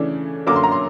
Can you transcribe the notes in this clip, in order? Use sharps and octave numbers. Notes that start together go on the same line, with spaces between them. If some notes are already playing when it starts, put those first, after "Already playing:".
Already playing: C#3 E3 A3 D4
F#2 D3 F#3 A#3 D6
C6
A#5
C6